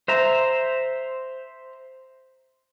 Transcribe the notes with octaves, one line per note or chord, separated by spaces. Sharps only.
C5 E5 A#5